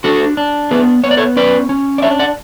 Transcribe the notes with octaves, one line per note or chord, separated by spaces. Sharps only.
D4 F#4 A4
D4
B3 G#4 B4
B3 C#5
D5
A4 C#5
C#4 B4 D5
C#4
D5
D4 C#5 E5
D5 F#5